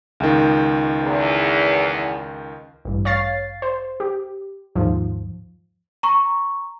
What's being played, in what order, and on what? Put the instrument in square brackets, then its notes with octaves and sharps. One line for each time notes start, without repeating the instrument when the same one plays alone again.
[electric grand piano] C#2 D#3
[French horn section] E2
[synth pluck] A1 G2
C#5 F5 A6 C7
C5
G4
D#2 G#2 F3
[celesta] A#5 C#6